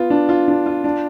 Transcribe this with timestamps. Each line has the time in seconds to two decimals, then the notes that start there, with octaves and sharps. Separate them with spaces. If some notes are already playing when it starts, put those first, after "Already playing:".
Already playing: B3 F4
0.10 D4
0.29 F4
0.48 D4
0.66 F4
0.84 D4